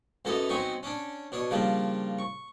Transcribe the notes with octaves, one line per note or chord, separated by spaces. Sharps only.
F#2 E3 B3 A4 D#5
F#3 B3 C4 D#4 G#5 C#6
C#4 D4
B2 D4 C#5
C#3 F3 G3 A#3 D4
C#6